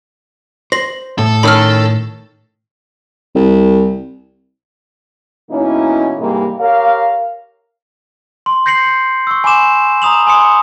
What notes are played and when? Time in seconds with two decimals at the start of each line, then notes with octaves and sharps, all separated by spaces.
0.72 C5 A#6 F#7
1.18 A2 A4
1.43 D#3 C#4 B5 E6 F6
3.35 C2
5.51 B2 E3 A#3 C#4 D#4 E4
6.19 G#2 C3 E3 G3 G#3 A#3
6.60 G4 A#4 C#5 F5
8.46 C6
8.66 G6 A#6 C7 C#7 F#7
9.27 C#6 E6
9.44 G#5 B5 C6 D6 E7
10.02 A#5 B5 D#6 F7 F#7
10.27 G#5 C6 D#6 C#7